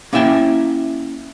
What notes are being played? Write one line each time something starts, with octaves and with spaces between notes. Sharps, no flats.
A#3 C#4 E4 E5 G5